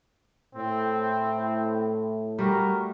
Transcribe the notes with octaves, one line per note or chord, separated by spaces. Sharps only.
A2 C4
G3 A3 F#4 A#4